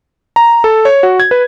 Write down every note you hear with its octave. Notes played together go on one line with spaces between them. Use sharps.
A#5
A4
C#5
F#4
G#6
B4